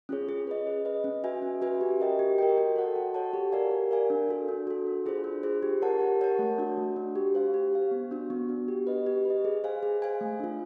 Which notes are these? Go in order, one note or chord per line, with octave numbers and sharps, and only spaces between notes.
C#4 F4 G#4 C#5
G#4
B4 D#5
G#4
B4 D#5
C#4
F#4 B4 E5 G#5
C#4
F#4 B4 E5 G#5
G4
A#4 D#5 G5
G4
A#4 D#5 G5
F#4
A4 C#5 F#5 A5
F#4
A4 C#5 F#5 A5
G4
A#4 D5 F5 G#5
G4
A#4 D5 F5 G#5
D4
F#4 A4
D4
F#4 A4
D4
F4 G#4 C5
D4
F4 G#4 C5
G4
A#4 C#5 F#5 A5
G4
A#4 C#5 F#5 A5
A3
D4 F#4
A3
D4 F#4
G4
C5 F5
G4
C5 F5
B3
D4 F#4
B3
D4 F#4
G4
B4 D#5
G4
B4
D#5
G#4
C5 F5 G#5
G#4
C5 F5 G#5
A3
D4 F4